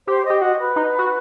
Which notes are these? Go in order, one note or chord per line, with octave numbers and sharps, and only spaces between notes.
G4 C5
D#5
G4
F#4 D#5
B4
D#4
F#4